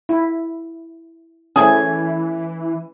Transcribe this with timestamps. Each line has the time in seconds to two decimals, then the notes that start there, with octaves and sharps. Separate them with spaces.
0.09 E4
1.56 E3 A3 C#4 G#4 G#5